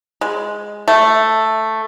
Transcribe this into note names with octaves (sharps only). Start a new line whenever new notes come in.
G#3
A3